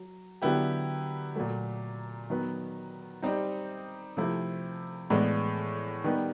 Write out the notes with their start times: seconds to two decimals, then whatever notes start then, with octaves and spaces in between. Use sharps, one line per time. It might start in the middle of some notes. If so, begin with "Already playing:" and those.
Already playing: F#3
0.42 D3 F#3 B3 E4 G4
1.35 A#2 F#3 A3
2.30 D#3 F#3 B3
3.22 G3 C4 D#4
4.17 C3 F3 A3 C4 E4
5.10 A2 E3 G#3 B3 D4
6.04 D#3 G3 B3 D#4 G4